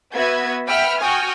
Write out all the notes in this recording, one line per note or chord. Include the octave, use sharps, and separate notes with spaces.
B3 F#4 B4 E5 G#6
B4 E5 F#5 G5 B5 F6
F#4 G5 G#5 C#6 D#6 F6